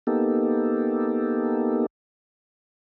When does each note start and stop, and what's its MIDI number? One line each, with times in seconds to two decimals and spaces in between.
0.07 1.86 58
0.07 1.86 59
0.07 1.86 63
0.07 1.86 67
0.07 1.86 69